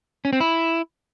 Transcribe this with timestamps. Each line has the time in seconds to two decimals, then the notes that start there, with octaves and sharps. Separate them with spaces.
0.25 C#4
0.33 C4
0.40 E4